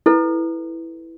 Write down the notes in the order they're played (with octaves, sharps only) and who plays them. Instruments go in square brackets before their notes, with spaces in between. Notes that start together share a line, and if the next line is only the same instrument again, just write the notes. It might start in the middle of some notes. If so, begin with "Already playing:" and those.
[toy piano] E4 A4 B4